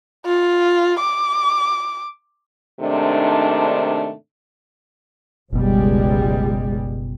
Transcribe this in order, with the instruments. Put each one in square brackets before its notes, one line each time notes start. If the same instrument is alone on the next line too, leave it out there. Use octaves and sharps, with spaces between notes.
[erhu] F4
D6
[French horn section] G#2 C3 D#3 A3 D4
[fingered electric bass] F#1 B2 [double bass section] C#2 G3 G#3